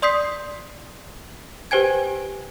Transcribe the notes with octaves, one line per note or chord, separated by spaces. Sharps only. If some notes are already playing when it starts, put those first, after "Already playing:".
D5 C6 D#6 G6 B6 C7
G4 B4 C5 G5 G#5 G#6